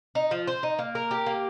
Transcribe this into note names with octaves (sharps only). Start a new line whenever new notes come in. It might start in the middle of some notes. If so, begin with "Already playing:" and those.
D#4
F3
C5
D#4
A#3
A#4
G4
A#3